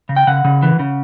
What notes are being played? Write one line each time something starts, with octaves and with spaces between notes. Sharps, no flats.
C#3
G5
C#3 F#5
C#3
E3
C#3